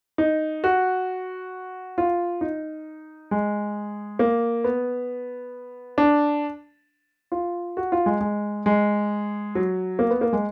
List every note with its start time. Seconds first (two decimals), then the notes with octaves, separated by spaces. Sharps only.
0.18 D#4
0.64 F#4
1.98 F4
2.41 D#4
3.31 G#3
4.19 A#3
4.64 B3
5.98 D4
7.32 F4
7.77 F#4
7.92 F4
8.06 G#3
8.21 G#3
8.66 G#3
9.55 F#3
9.99 A#3
10.11 B3
10.21 A#3
10.33 G#3